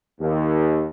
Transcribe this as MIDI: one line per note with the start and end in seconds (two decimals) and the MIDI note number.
0.20 0.86 39